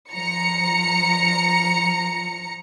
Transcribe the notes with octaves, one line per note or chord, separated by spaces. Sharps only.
F3 A#5 C#7